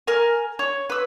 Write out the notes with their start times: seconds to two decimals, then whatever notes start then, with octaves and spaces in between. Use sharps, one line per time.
0.07 A#4 G#5
0.59 C#5
0.90 B4 E6